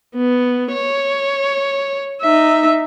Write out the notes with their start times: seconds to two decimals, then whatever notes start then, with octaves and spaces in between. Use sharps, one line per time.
0.16 B3
0.73 C#5
2.22 D#4 E5